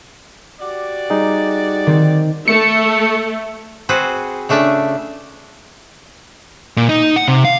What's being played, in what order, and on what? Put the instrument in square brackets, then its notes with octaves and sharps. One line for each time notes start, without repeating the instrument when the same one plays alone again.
[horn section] F#4 G4 D5
[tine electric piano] G3 D#4 G#4
[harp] D#3 C4
[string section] A3 [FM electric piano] C#7
[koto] C4 F#4 G#4 B4 C5
C#3 A3 D4 E5 A5
[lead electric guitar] A#2
D#4
F#5
C3
F5